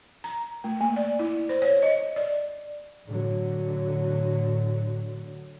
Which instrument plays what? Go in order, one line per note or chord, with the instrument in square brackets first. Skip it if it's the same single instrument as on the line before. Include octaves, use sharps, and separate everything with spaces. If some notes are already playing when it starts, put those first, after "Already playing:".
[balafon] A#5
A3
A#3
D5
E4
C5
C#5
D#5
D5
[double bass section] A2 D3 F#3